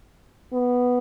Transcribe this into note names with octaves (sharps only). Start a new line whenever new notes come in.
B3